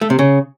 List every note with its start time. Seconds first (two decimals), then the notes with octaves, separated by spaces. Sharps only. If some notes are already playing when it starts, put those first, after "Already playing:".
0.01 A3
0.10 C3
0.19 C#3